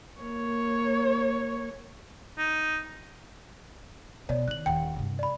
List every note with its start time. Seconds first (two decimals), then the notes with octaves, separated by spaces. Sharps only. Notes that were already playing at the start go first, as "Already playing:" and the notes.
0.21 A#3 C#5
2.38 D#4
4.29 B2 C#5 D5
4.48 D#3 F#6 F#7
4.66 D#1 D#2 F#5 G5
4.96 G2 C3
5.19 D5 B5